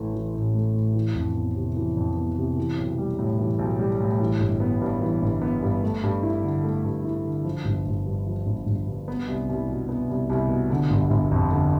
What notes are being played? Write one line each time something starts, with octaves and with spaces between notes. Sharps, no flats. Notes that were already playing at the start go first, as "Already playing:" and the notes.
Already playing: A1 A2 E3 A3
E3
A1
A3
A2
E3
F2
B3
C3
E3
F2
B3
C3
E3
B1
G3
A2
E3
B1
G3
A2
E3
G1
B3
G2
E3
G1
B3
G2
A3
G2
E4
D3
A3
G2
E4
D3
F3
G1
G1
G2
F3
G1
G1
G2
B3
C2
C2
B2
B3
C2
C2
B2
D3
G1
G1
F2
D3